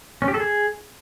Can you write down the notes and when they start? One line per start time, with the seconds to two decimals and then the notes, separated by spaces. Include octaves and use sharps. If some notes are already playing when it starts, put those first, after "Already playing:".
0.22 C#4
0.28 G4
0.34 A4
0.40 G#4